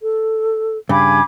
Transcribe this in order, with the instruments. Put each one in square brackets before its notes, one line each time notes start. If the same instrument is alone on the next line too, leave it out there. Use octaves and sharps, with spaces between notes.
[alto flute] A4
[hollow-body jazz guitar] G2 C#3 [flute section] G#5 B5 D6